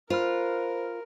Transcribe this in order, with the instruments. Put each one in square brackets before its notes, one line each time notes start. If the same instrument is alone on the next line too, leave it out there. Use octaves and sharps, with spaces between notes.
[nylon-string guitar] F4 [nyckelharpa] A#4 [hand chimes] C5 B5 F6